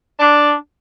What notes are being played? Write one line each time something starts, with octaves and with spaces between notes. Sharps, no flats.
D4